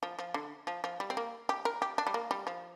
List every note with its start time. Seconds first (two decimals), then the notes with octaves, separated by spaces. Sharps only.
0.03 F3
0.19 F3
0.34 D3
0.67 F3
0.84 F3
1.00 G3
1.10 C4
1.17 A#3
1.49 G4
1.65 A#4
1.82 G4
1.98 D4
2.07 G3
2.14 A#3
2.31 G3
2.47 F3